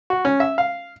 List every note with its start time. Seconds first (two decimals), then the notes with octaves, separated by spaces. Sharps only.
0.10 F#4
0.25 C#4
0.40 E5
0.58 F5